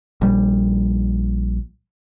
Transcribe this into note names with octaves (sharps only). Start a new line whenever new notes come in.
A#1 G3